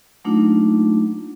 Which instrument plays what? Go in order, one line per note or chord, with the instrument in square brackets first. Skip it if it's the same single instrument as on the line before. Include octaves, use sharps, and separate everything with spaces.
[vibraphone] F#3 A3 A#3 D4 D#4 F4